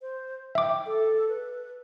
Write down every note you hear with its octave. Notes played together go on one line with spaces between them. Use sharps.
C5
E5 G5 D6
A4
B4